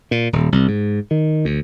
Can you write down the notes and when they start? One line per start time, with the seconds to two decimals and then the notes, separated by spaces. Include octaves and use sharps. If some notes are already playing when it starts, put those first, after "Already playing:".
0.11 A#2
0.33 D#1
0.52 C2
0.68 G#2
1.11 D#3
1.45 D2